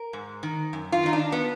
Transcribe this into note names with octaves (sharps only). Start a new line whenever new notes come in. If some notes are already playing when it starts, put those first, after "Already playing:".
Already playing: A#4
G#2
D#3
F#2
F4
D#3 D#4
D4
B3